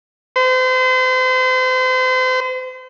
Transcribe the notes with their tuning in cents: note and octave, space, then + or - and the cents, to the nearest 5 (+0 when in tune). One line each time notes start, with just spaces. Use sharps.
C5 -35